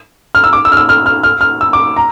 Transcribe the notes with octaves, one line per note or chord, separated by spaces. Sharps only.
F6
E6
D6
E6
F6
E6
F6
F6
F6
F6
E6
D6
A#5